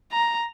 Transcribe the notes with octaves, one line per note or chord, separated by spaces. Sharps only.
A#5